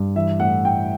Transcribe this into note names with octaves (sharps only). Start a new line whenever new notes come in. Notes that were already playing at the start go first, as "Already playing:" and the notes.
Already playing: G2
E3 E5
A2 F#5
A2 G5